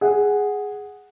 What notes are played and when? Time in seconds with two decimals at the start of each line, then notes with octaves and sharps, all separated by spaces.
0.01 G#4 F#5